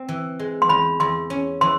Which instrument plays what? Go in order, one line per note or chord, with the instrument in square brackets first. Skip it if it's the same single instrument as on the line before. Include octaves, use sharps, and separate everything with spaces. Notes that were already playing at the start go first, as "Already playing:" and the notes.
Already playing: [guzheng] C4
E3
G#3
[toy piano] C6
[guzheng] E2 [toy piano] B5
[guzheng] E2 [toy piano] C6
[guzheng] C#4
[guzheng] E3 [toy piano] C6